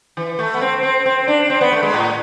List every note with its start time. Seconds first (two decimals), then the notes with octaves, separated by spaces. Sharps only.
0.17 E3
0.39 A3
0.54 B3
0.61 C4
0.83 C4
1.06 C4
1.28 D4
1.50 C4
1.61 B3
1.72 A3
1.83 G#3
1.94 A2